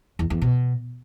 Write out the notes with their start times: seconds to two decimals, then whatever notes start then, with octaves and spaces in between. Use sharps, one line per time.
0.19 E2
0.30 E2
0.42 B2